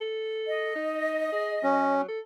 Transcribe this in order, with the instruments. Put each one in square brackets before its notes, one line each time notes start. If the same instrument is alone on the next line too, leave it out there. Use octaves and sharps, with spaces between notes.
[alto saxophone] A4
[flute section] D#5
[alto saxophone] D#4
G#4
[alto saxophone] F#3 [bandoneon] C#4
[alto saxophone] A4